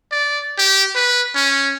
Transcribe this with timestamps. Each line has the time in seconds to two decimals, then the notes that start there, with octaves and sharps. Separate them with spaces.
0.11 D5
0.58 G4
0.95 B4
1.35 C#4